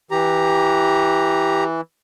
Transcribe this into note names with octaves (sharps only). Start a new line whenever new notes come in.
E3 G4 A#5